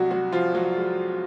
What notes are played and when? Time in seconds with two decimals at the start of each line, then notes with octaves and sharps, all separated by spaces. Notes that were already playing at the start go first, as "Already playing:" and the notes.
Already playing: C2 F#3 F#4
0.11 F#3 F#4
0.32 F3 F4
0.55 F#3 F#4
0.77 G#3